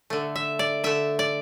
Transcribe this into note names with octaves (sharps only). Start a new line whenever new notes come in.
D3 A3
E5
D5
D3 A3 E5
D5